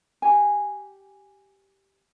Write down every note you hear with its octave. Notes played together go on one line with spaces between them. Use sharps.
G4 G#5